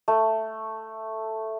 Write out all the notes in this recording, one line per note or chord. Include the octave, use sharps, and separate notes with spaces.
A3